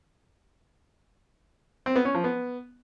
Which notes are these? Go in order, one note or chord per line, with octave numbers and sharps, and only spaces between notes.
C4
B3
C#4
F3
B3